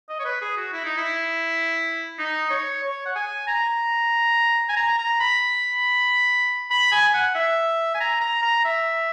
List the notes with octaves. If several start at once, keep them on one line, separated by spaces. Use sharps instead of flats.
D#5
C#5
B4
G#4
F#4
E4
D#4
E4
D#4
C#5
C#5
F#5
G#5
A#5
G#5
A#5
A#5
B5
B5
G#5
F#5
E5
G#5
A#5
A#5
A#5
E5